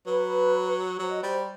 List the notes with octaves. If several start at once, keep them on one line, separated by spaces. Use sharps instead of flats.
F#3 B4
F#3 C5
D#5
G3 C5